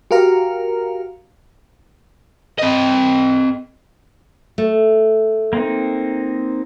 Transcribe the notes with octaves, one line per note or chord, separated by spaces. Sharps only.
F#4 G4 A#4 F5 A#5
C4 D#5
A3
A#3 C4 D#4